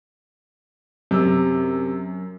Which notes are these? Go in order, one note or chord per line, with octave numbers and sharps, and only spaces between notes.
F#2 C3 E6